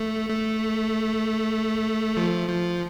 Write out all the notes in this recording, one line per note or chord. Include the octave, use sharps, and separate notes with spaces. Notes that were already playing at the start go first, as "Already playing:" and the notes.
Already playing: A3
A3
F3
F3